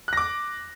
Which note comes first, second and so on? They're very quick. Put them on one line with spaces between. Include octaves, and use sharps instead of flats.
F#6 A#6 D6